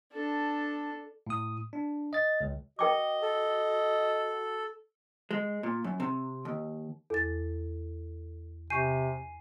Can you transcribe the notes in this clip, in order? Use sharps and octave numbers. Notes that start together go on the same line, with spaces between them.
D4 A4
A2 D#6
D4
D#5 A6
C#2
F#4 A#4 D#5 G5 D6
A4
G#3
A#2
F#2
C3
D#2
E2 A4 A6
C3 G#5 C#6 G6 C7 D#7